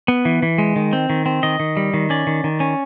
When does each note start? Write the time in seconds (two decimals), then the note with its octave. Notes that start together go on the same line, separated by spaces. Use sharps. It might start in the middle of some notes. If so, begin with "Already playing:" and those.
0.08 B3
0.25 E3
0.43 E3
0.58 G#3
0.76 D#3
0.93 C4
1.10 D#3
1.26 C4
1.43 D#3 D#5
1.60 D#3
1.77 G3
1.94 D#3
2.10 C#4 D5
2.27 D#3
2.44 D#3
2.60 C#4